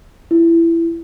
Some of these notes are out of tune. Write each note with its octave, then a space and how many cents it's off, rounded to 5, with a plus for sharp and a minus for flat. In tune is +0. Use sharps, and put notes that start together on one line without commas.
E4 +20